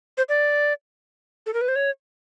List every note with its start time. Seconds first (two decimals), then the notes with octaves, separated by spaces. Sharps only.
0.18 C5
0.29 D5
1.46 A4
1.54 A#4
1.61 B4
1.68 C5
1.76 C#5